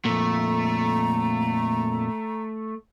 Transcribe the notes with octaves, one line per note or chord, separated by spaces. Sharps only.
F2 A#2 A3 A#5